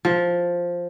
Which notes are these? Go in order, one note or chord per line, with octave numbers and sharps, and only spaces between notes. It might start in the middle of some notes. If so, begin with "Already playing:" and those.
F3